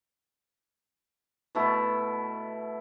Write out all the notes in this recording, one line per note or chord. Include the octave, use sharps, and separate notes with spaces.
B2 A3 E4